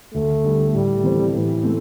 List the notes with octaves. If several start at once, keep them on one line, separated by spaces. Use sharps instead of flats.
D2 A3
D3 G3
A2 G3
E3 C4 A4 C5
A2 E3
A3 C4